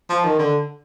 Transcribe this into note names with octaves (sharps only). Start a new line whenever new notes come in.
F3
D#3
D3